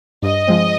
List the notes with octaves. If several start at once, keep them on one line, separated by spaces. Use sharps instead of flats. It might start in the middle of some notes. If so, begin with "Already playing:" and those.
G2 D#5
F3 G#3 C4